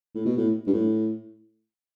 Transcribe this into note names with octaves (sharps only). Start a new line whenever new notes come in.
A2
B2
A2
G2
A2